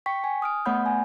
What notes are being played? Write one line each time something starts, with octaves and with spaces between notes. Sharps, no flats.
G5 C#6 B6
G#5
D#6 F6 D7
A3 B3 C#5 F#5 B5 G6
G#5